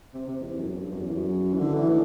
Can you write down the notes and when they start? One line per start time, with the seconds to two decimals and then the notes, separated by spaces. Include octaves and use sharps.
0.14 C3
0.28 C3
0.43 E2
0.53 E2
0.58 F#2
0.71 F#2
0.81 G2
0.91 F#2
1.01 E2
1.16 F#2
1.54 E3
1.59 D3
1.74 E3
1.88 A2